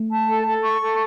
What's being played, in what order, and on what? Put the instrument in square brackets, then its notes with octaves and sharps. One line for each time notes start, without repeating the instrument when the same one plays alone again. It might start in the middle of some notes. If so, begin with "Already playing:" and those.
Already playing: [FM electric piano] A3
[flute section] A5
A4
A4
C#6
A4